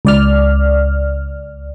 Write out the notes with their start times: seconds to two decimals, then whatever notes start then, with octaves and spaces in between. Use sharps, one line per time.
0.05 C#2 D5 F6